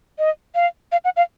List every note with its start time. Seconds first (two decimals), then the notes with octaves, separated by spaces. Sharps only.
0.19 D#5
0.55 F5
0.92 F5
1.05 F#5
1.17 F5